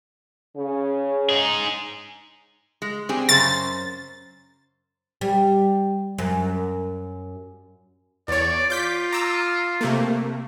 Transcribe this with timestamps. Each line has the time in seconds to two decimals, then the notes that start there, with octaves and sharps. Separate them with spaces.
0.57 C#3
1.30 D#4 G#4
2.82 G#3
3.09 G3 C4 G#4
3.29 F#2 C#3 C5 A6
5.21 G3
6.18 F#2
8.28 E2 C#5 D5
8.70 F4 D6 G6 B6
9.12 A#5 D6 E6
9.81 C3 A3 A#3